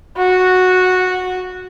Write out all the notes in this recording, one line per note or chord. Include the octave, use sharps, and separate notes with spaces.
F#4